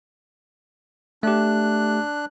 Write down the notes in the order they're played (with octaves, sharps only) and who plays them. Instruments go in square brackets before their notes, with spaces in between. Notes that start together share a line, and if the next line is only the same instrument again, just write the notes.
[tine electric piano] A3 G4 [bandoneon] D4 F#6